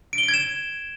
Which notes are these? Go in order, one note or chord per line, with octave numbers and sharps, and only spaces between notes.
D7
G7
D7
G#6
E7